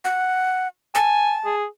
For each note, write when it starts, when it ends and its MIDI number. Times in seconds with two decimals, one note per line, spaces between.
0.05 0.68 78
0.95 1.36 80
0.95 1.55 81
1.45 1.66 68